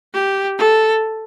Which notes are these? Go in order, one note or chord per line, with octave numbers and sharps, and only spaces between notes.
G4
A4